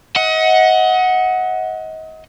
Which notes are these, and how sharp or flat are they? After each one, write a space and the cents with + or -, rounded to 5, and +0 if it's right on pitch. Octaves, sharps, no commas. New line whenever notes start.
D#5 +35 F#5 -5